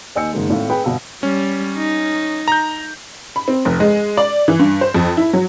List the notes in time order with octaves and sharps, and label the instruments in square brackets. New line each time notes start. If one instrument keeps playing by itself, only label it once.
[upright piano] D#2 D#5 G#5 E6 G6 C#7
F#1 D#3 G#3
G#1 A2 A3 F5
G#4 B4 G5 B5
G1 B2 F5 E6
[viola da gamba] G3 [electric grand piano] C#4
[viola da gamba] D#4
[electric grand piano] A#5 G6
[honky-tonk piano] B5
C4
F1
G#3
D5
E3
G2
C5
F2
E4
F#3